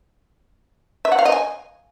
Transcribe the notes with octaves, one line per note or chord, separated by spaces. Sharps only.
E5
F#5
F5
D#5
G#5